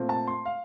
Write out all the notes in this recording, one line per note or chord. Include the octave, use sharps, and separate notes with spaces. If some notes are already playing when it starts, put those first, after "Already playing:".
Already playing: A#2 A3 C4
A5
C6
F5